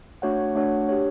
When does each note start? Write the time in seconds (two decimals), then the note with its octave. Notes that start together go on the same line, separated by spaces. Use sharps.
0.22 A3 D4 F#4 C#5 F#5
0.55 A3 D4 F#4 C#5 F#5
0.89 D4 G4 C#5